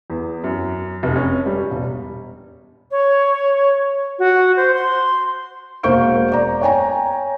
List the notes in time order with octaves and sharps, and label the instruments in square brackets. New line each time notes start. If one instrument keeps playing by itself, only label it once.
[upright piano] E2
F#2
F1
C#4
G3
E1
[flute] C#5
F#4
C5
C6
[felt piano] E1 A#3 C5 C#6 G6 D7
D5 A#5
C#5 G5 G#5 A#5